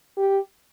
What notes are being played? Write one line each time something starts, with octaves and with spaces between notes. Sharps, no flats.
G4